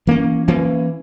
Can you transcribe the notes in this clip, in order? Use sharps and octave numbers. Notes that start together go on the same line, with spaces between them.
E3 A#3 C#4
E3 A#3 C#4